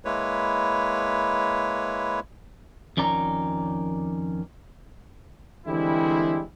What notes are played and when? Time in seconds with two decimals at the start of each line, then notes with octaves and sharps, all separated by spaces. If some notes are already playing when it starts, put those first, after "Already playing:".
0.05 G#3 A#3 E4 B4 C#5
2.97 F2 D#3 C#4 D5 A#5
5.67 D3 E3 G3 G#3 C4 E4